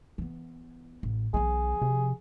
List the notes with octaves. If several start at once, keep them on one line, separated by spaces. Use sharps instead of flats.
E3 B3
A1
B1 E3 B3 G#4
C3 F3